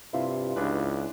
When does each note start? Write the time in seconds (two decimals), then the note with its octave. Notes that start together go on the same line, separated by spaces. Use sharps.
0.13 G2 C3 E4 F4 C6
0.56 C#2 C#4 D4 B4